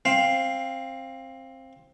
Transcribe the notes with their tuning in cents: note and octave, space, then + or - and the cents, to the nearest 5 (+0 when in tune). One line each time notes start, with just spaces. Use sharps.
C4 +15 F5 +0